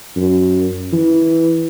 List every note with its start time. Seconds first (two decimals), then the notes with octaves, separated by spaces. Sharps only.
0.16 F#2
0.93 E3